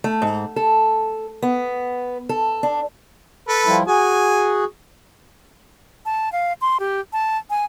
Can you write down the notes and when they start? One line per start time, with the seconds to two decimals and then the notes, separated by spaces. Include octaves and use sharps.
0.04 A3
0.22 G#2
0.56 A4
1.42 B3
2.29 A4
2.63 D4
3.48 A4 B4
3.66 F3 G3 E4
3.87 F#4 G#4 G#5
6.05 A5
6.32 F5
6.61 C6
6.80 G4
7.13 A5
7.50 G#5